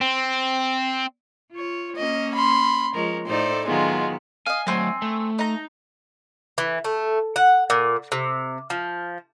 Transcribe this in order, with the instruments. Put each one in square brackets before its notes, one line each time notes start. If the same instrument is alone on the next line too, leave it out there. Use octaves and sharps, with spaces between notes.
[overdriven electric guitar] C4
[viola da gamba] F4 C#5
[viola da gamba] A#3 C#4 [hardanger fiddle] D#5
[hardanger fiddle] B5 C6
[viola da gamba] F3 G#3 C#5 [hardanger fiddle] A#4
[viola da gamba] A2 D#4 A4 [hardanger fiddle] C5 D5
[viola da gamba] D#3 F#3 B3 [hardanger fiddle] G#3 F4
[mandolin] D#5 F5 [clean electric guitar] G#5
[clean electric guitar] F#3 A3 [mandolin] C4 G#5
[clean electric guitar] A3
[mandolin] D#4 A#5
[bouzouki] E3
A3
F#5
A#2
C3
F3